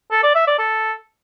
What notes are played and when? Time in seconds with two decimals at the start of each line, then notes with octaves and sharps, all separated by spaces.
0.11 A4
0.23 D5
0.35 E5
0.47 D5
0.59 A4